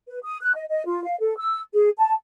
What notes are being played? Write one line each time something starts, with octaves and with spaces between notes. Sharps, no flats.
B4
D#6
F#6
D#5
D#5
F4
F5
A4
E6
G#4
A5